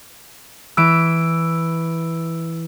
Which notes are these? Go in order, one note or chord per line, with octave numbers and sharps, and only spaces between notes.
E3 E6 D7